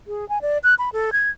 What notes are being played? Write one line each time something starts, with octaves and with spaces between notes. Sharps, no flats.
G#4
G#5
D5
F#6
B5
A4
G#6